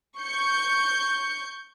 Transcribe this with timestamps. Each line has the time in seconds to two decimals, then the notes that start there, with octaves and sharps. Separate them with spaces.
0.18 C#6 G6 C#7